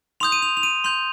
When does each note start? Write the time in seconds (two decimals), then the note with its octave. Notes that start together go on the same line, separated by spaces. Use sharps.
0.20 C6 D#6 G6 F7
0.32 D#7
0.42 F7
0.57 F7
0.63 D#7
0.84 C6 G6 F7